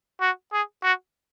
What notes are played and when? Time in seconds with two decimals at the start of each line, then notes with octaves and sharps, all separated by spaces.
0.21 F#4
0.52 G#4
0.83 F#4